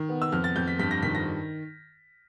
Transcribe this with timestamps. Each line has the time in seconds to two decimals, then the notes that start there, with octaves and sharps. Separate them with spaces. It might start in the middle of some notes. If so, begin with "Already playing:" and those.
Already playing: D#3
0.09 B3
0.22 E6
0.32 F2 F6
0.44 A6
0.56 F2 G6
0.68 B6
0.79 G2 B6
0.91 A#6
1.03 D#3 B6
1.15 A#6